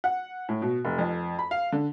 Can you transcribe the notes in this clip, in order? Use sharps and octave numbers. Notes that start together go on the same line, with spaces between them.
F#5
A2
B2
F1
F2
B5
F5
D3